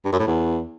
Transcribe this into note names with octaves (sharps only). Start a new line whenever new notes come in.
G2
F#2
A2
E2